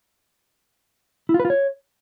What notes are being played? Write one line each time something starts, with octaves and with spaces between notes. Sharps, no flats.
E4
F4
B4
F4
C#5